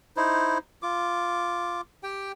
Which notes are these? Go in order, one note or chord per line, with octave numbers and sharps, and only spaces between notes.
D#4 E4 C5
F4 D6
G4 G5